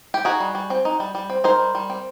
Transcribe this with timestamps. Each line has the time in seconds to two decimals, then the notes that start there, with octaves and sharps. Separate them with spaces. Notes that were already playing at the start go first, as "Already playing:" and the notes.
0.14 G4
0.25 D#4 F#4 G#4
0.40 G3
0.55 G3
0.70 C4
0.85 D#4
1.00 G3
1.15 G3
1.30 C4
1.44 D#4 A#4 C5
1.59 G3
1.75 G3
1.90 C4